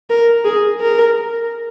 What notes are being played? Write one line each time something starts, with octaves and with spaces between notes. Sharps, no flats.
A#4
G#4
A#4